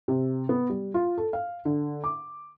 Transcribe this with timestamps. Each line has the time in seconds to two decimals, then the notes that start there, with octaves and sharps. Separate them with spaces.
0.08 C3
0.49 B3
0.69 G3
0.94 F4
1.18 A4
1.33 F5
1.65 D3
2.04 D6